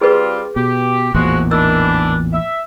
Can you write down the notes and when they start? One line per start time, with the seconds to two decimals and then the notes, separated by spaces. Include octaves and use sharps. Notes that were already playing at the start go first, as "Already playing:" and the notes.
0.01 G3 C4 F4 G#4 B4
0.56 B2 G4
1.14 A1 E2 A#2 F3 G#3 F#4
1.51 D#3 E3 D4 E6
2.33 E5